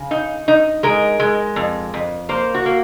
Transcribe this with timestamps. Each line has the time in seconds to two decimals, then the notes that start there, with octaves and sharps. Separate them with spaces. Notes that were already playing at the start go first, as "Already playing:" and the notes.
Already playing: C#3
0.11 D#4
0.48 D#4
0.83 G#3 A#4
1.20 G#3
1.56 F2
1.94 F2
2.29 A#3 C5
2.54 F#4
2.66 A#3